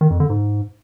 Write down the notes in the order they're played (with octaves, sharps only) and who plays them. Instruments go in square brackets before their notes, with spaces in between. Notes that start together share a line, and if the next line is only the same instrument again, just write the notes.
[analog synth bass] D#3
F2
D3
G#2